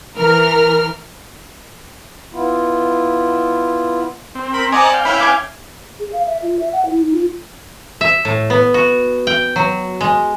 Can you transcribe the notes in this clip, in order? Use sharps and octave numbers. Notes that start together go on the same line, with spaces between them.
E3 A#4 F6
B3 E4 F4
C4
A#4 B5
C4 D5 D#5 F#5 G#5 A#5 D6
F5 G5
C#4 E4 B5
G#5 D6
G#4
F5
E5
F4
E5
F#5
E4
D#4
F4
E5
A2
B3
F#4
G5
F#3
G#3